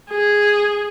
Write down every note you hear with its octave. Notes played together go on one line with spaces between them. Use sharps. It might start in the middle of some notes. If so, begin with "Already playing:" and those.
G#4